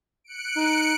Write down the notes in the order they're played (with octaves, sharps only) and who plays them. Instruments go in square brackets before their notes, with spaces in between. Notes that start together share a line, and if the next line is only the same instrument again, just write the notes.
[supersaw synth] F#6 C#7 D7
[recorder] D#4